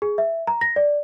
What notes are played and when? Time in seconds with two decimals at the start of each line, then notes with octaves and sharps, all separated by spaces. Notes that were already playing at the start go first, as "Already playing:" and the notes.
0.02 G#4
0.18 E5
0.47 A#5
0.61 A#6
0.76 D5